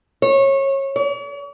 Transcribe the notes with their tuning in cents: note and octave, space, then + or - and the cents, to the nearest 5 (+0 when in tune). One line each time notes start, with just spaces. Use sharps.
C#5 -25
C#5 +45